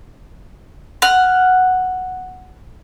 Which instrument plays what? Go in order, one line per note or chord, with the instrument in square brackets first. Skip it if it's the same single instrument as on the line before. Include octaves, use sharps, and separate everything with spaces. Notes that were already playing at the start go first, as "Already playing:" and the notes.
[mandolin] F#5 F6